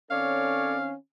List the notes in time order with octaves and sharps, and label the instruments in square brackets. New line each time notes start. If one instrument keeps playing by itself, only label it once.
[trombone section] D#3 C4 C#4 [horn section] A4 C#5 D5 [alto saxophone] F5